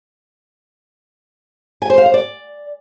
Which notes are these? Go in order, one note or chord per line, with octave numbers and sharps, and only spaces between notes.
G#5
C5
F5
C5
D5